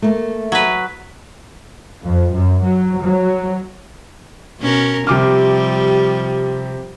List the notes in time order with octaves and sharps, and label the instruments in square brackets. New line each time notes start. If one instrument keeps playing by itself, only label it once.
[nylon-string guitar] A3 A#3
[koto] F#3 B4
[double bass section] F2
F#2
F#3
F#3
[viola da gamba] B2 C#4 A#4
[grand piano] C3 D6 F6 [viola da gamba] F3 G3